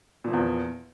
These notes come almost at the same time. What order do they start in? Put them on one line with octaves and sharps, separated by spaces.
A#2 F3 E3 E2